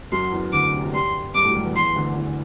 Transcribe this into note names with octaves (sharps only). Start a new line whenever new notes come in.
F#2 F#3 C6
E2 E3
D2 D3 D6
C3
F#3
G2 G3 C6
G2 G3 D6
A2 A3
F#3
G2 G3
E2 E3
E2 E3 C6
D2 D3
E2 E3